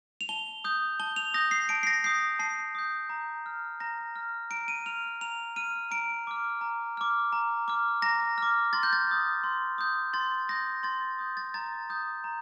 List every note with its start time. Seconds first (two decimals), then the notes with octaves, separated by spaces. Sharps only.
0.21 F7
0.29 A5 G7
0.64 D#6 G6
1.00 A5 G7
1.16 F7
1.34 D#6 G6 A#6
1.51 C7
1.69 A5 D7
1.83 C7
1.87 A#6
2.04 D#6 G6 C7
2.39 A5 C7
2.75 D#6 G6
3.09 A#5
3.46 F6
3.80 A#5 A#6
4.16 F6
4.50 A#5 D7
4.68 D#7
4.86 F6 F7
5.21 A#5 F7
5.56 F6 D#7
5.91 A#5 D7
6.27 D6 F6
6.61 A#5
6.97 D6 F6
7.32 A#5
7.68 D6 F6
8.02 A#5 A#6
8.38 D6 F6
8.73 C6 A6
8.83 G6
8.93 A6
9.07 D#6 G6
9.44 C6
9.78 D#6 G6
10.13 C6 A6
10.49 D#6 G6 A#6
10.83 C6 A6
11.19 D#6 G6
11.37 A6
11.54 A#5 A6
11.90 D#6 G6
12.24 A#5